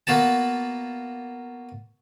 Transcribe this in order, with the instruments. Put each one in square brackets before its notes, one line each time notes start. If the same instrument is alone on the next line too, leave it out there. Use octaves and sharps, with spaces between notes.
[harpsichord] A#3 B3 F#4 A5